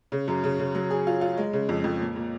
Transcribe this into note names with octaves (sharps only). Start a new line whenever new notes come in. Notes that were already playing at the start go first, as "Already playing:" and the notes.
C#3
F#2
C#3
C#3
F#3
G#4
F4
F4
G#3
C#3
F2
F2
A#2
A#2